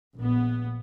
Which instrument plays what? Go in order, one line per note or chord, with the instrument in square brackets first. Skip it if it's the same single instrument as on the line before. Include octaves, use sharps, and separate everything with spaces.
[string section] A#1 B3